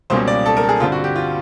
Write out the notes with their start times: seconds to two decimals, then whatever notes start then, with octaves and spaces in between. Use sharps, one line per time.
0.10 C#2 B2 G3 A#3 C#4 C5
0.27 D5
0.46 A4
0.57 A#4
0.63 A4
0.69 G#4
0.80 G2 D3 G3 C4 F4
0.92 F#4
1.04 G4
1.16 F4